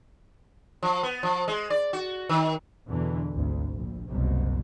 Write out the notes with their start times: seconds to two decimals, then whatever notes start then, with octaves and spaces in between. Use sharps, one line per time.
0.83 F3
1.03 B3
1.23 F3
1.48 G#3
1.70 D5
1.93 F#4
2.29 D#3
2.89 E2 B2 D3 E3
3.32 G#1 D2
3.76 A#1
4.09 F#1 C2 B2